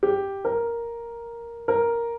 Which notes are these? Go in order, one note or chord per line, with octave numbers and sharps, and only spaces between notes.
G4
A#4
A#4